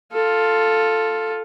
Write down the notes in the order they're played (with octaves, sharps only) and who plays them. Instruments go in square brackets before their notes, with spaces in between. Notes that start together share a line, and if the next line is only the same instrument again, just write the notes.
[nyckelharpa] F4 A4